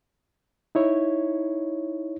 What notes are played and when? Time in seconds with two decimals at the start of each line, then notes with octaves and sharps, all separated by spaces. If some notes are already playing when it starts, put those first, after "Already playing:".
0.75 D#4 E4 C#5